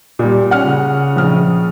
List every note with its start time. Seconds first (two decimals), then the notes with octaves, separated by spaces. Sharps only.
0.19 A#2 G3
0.51 C#4 F#5 F6
0.65 C#3
1.16 A#1 F6